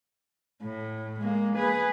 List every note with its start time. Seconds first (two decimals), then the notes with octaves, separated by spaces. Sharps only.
0.63 A2
1.21 G#3 A#3
1.57 G#4 B4